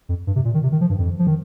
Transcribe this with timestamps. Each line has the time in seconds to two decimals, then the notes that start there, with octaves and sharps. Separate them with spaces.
0.09 F2
0.27 G2
0.36 C3
0.45 A#2
0.54 D#3
0.63 C3
0.72 D#3
0.81 F3
0.90 G2
0.99 F2
1.19 F3
1.27 D#3